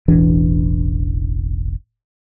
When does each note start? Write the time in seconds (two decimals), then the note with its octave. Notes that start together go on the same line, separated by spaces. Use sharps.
0.08 E1 A1 E3 D4